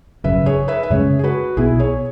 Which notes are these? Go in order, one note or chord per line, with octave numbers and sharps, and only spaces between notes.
G#1 F#2 C#3 F#3 B4 E5
G#4 C#5
B4 E5
E5
F#2 C#3 G#3 C#4 G#4 C#5
G#4
F#4 B4
B1 B2 B3 E4 G#4
G#4 C#5